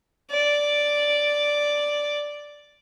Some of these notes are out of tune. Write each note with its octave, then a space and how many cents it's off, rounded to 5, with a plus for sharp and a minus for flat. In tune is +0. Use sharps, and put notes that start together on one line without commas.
D5 +0